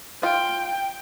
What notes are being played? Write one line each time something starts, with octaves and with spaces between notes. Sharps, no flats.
F4 G5